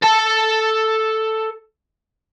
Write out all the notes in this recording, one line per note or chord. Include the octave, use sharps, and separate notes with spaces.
A4 A5